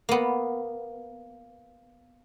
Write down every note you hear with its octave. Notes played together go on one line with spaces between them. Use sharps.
A#3 B3